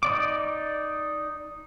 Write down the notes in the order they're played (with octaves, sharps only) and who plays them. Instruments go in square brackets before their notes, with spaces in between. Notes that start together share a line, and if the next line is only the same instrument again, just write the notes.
[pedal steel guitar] D#4 D5 D6